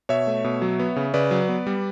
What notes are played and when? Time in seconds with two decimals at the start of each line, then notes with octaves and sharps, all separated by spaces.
0.09 B2 C#5 E5
0.27 A3
0.44 B2
0.62 F#3
0.79 B3
0.96 C#3
1.14 C#3 B4 D5
1.31 F#3
1.49 B3
1.67 G3